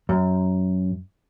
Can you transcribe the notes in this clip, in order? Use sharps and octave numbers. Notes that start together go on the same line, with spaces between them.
F#2